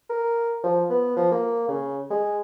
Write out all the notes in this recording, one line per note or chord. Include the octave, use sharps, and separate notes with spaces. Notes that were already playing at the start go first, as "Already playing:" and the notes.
A#4
F3
B3
F3
A#3
C#3
G#3